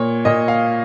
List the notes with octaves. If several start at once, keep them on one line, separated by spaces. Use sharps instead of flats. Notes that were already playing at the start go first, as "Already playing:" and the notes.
Already playing: A#2 C#5
A#2 D#5
F5